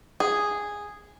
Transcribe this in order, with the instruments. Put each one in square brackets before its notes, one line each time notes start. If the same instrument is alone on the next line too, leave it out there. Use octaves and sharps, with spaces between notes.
[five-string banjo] G#4